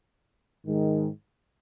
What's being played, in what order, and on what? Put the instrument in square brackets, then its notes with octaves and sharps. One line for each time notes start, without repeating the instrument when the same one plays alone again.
[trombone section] G#2 D#3 G#3